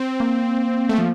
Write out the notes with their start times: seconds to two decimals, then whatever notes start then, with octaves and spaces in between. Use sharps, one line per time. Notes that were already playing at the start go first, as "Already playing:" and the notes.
Already playing: C4
0.20 A#3
0.89 A3
0.98 F3